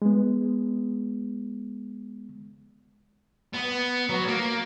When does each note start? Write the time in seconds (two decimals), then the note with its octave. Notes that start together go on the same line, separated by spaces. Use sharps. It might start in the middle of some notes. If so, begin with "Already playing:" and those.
0.02 G#3 B3
3.53 B3
4.10 F#3
4.28 A#3